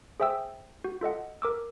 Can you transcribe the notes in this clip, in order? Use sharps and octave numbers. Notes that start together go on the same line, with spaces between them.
G#4 C5 E5 G5 E6
F#4
F4 A4 D#5 F#5
A#4 D6 E6